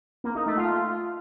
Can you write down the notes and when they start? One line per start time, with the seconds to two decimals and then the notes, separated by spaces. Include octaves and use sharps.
0.24 A#3
0.35 D#4
0.46 A3
0.57 F4